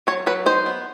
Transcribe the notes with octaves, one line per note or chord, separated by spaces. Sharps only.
F#3 C#5
F#3 B4
D#4 C5
B3